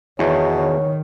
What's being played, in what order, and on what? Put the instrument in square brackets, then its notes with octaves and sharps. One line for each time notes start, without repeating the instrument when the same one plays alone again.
[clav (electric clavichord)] E2 [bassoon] B2 [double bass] D#3 [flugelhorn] C#5
[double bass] D#3 [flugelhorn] C#5